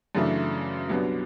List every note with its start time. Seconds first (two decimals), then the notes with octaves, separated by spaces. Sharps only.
0.15 F#2 C#3 E3 A3 D4
0.89 C2 B2 F#3 B3 D4